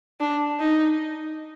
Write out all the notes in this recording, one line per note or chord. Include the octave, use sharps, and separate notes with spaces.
D4
D#4